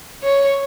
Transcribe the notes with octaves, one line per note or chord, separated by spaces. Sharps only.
C#5